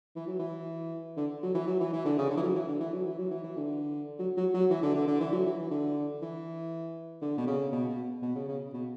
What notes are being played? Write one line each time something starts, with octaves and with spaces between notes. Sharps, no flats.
E3
F#3
E3
D3
F#3
E3
F#3
E3
E3
D3
C#3
D3
E3
F#3
E3
D3
E3
F#3
E3
F#3
E3
E3
D3
F#3
F#3
F#3
E3
D3
D3
D3
E3
F#3
E3
E3
D3
E3
D3
B2
C#3
B2
B2
B2
C#3
C#3
B2